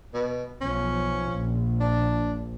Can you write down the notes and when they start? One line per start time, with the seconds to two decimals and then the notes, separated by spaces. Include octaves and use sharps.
0.14 B2
0.61 B1 F3 C#4
1.32 A#1
1.80 D4